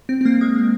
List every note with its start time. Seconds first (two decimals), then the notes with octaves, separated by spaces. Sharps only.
0.09 C4
0.21 C4
0.25 A#3
0.41 G#3